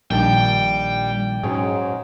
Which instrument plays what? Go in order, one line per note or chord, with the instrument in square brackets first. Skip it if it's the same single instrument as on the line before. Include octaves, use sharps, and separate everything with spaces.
[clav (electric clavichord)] A#1 D#3 A5 [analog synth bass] G3 [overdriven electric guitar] G5
[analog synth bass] G#2 [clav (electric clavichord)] F#3 C#4 G#4